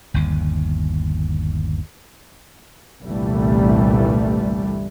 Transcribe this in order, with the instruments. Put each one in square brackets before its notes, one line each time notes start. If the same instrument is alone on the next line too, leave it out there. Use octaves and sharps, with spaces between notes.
[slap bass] G1 D#2
[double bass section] G1 C2 A#2 E3 G3 A3